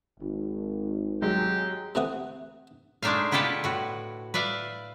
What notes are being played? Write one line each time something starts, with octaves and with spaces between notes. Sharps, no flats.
G#1
F#3 G#3 G4
C3 E3 A3 F#5 C#6 D#6
G#3 A3 D4 D#4 E5 F5
B2 E4 F4 G4 A4 B4
A2 F#4
B4 D5 E5 F5